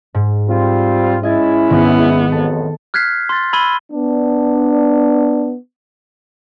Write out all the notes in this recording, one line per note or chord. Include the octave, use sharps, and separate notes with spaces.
G#2
G3 C4 F4
G#3 C#4 E4 D#5 G#6 A6
G#1 G#2 D#3 B3
A1 F2 A4
F6 F#6 G#6 B6 C7
C6 A6
B5 E6 G#6 D#7 G7
B3 D4